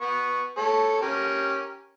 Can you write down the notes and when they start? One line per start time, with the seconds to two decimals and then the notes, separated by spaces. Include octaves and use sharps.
0.01 B3 C#6
0.57 A4 C#5
1.01 C#4 G4 A#4